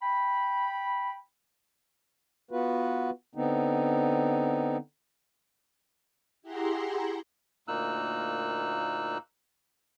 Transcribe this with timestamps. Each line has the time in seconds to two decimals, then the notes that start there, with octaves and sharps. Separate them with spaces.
0.01 G5 B5
2.51 B3 F4 F#4 B4
3.35 D3 B3 C4 D#4
6.42 E4 G4 G#4 F#5 A#5 C6
7.68 D2 A#2 A#3 D#4 E6 F#6